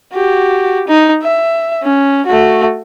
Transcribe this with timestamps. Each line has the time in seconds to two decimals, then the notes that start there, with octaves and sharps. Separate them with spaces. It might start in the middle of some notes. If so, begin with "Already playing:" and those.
0.13 F#4 G4
0.88 D#4
1.23 E5
1.83 C#4
2.26 A3 F#4